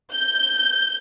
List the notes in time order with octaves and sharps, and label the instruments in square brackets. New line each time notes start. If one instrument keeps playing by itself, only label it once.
[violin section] G6